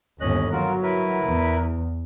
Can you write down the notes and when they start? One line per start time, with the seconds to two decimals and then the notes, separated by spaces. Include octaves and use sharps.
0.21 G1 D#2 C#4 D#5 F#6
0.52 F#3 F4 F#4 A#4
0.83 E4 A#4 B4
1.25 E2